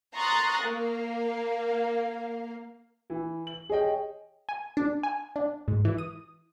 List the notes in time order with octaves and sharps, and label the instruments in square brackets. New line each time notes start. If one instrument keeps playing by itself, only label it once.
[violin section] A#5 C6 C#6 D#6 F#6 A6
A#3 F5
[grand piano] E3
F#7
G#4 C#5 D#5 G5
[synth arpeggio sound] G#5
D4
G#5
D4
G#2
E3
D#6